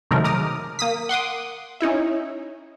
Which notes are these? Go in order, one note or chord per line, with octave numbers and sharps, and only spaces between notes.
C3 D#3 F#3 G#3 A3 A#4
A#5 D6 D#6 F6
A#3 D#6 B6
F#5 C6 D6 D#6
C#4 D#4 E4 E5